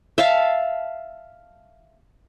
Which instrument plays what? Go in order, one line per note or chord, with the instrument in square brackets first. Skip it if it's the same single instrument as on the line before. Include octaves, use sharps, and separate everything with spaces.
[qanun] E5 F5 A5